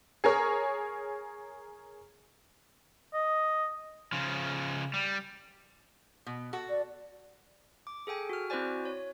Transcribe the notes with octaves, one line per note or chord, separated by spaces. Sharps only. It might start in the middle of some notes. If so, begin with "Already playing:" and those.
G#4 A#4 C#5
D#5
C#3 F3
G3
B2
F#4 A4
D5
D6
G#4 A4 G5 G#5
F#4 F6
C4 E4 F#4 C5 D5 G#5
C#5